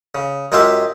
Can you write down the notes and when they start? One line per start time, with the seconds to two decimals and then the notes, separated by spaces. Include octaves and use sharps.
0.15 C#3
0.52 F#2 G#3 F4 G4 E5 F5